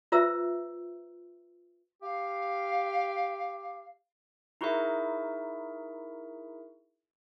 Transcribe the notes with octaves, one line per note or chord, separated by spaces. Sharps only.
F4 B4 C5 E5 A#5 E6
G4 F5
D#4 E4 F#4 G#4 A#4 E5